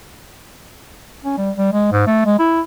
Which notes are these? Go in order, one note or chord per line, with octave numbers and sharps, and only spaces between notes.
C#4
G3
G3
G#3
G#2
A3
G#3
E4